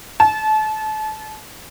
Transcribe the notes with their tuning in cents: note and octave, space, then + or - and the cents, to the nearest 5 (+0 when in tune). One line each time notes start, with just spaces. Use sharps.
A5 -30